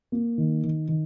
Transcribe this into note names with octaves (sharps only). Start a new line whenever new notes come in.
A#3
D#3
D#3
D#3